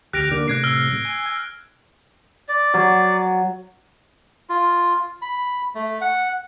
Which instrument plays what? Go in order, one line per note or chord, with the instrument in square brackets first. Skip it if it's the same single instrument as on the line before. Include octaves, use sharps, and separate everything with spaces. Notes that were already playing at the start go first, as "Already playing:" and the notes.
[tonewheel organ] D2 G4 F6 [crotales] F#6 A#6 D7
[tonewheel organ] D3 A#3 D4
[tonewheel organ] A2 C3 [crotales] F#6 G#6 C7
[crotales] E6 F6
[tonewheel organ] G#5
[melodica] D5
[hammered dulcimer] F#3
[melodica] F4
B5
A3
F#5